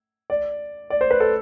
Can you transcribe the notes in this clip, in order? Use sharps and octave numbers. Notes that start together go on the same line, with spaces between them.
D5
D5
C5
B4
A4